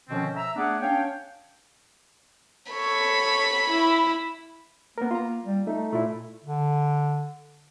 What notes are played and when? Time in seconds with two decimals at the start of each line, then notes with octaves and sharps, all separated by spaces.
0.09 B2 D3 D#3 F3 C4 C#4
0.36 E5 A#5 E6
0.56 A3 B3 D4 G#4 D5 F#5
0.81 C#4 D4 C#5 F5 G5
2.72 A4 C#5 B5
3.70 E4
4.98 A#3 B3 A#4
5.11 F4 A#5
5.45 G3
5.67 A3 D#4
5.93 A#2 A3 E4
6.45 D3